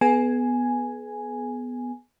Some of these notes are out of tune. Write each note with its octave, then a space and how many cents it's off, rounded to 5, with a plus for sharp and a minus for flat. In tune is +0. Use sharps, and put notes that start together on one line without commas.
B3 +0 G#4 +35 G#5 +0